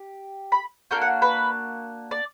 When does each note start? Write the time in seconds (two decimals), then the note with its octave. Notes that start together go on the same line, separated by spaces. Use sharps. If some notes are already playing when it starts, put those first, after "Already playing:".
Already playing: G4
0.52 B5
0.91 A#3 D4 F#4 G5
1.02 F#5
1.22 B4
2.11 D5